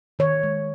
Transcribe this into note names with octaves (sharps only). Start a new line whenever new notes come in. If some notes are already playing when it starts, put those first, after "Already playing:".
D#3 C#5
G#3